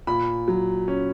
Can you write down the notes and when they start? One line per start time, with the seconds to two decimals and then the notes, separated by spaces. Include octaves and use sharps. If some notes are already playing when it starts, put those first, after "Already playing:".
0.07 A#2 B5
0.48 F#3
0.88 C#4